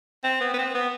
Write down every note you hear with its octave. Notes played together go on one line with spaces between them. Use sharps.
C4
B3
B3
C4
B3